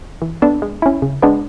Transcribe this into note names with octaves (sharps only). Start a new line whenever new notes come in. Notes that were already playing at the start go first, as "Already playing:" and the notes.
E3
B3 D4 A4
G#3
C#4 E4
C#3
G#3 B3 D4